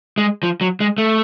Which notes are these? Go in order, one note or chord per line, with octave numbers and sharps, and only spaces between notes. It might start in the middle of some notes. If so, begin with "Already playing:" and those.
G#3
F3
F#3
G#3
A3